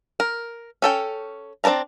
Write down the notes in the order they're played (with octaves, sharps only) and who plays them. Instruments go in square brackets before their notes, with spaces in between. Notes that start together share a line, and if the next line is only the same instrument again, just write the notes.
[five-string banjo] A#4
C#4 A4 G5
C4 D4 A#4 A5 A#5